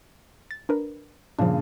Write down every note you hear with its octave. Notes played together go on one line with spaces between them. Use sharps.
A6
D4 A#4 B4
G2 A#2 C#3 F3 D4